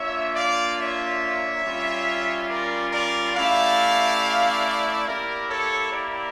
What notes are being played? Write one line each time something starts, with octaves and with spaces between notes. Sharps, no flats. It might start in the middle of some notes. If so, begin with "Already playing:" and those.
Already playing: A#3 D4 F4 C#5 E5
D5 F5
C#5 E5
G3 C#4 F4
A#4 D5
A#4 D5
A3 C#4 E4 G4 D5 F5
A#3 E4 G4 A#4 D5
A4 C#5
A#4 D5